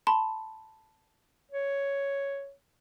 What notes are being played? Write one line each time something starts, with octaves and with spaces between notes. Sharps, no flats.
A5 B5 C6
C#5